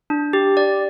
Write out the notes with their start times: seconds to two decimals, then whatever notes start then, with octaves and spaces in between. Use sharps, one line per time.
0.10 D4
0.33 G4
0.57 D5